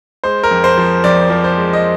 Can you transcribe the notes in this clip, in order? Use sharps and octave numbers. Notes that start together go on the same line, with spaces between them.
G#3 C5
A#4
F2
C5
F3
F2 D5
F3
C5
G#3
D#5